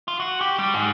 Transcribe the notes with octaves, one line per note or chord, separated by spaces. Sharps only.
F4
F#4
G4
G3
G#2